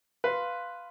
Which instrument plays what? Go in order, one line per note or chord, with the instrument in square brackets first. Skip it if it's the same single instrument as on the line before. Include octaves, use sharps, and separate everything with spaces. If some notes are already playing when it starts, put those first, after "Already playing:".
[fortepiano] B4 [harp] F5 C6